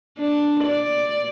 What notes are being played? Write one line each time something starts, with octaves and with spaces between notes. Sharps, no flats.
D4
D5